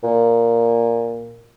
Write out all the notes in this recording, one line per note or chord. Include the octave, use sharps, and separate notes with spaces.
A#2